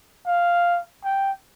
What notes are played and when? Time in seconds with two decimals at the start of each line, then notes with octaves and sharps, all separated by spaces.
0.26 F5
1.04 G5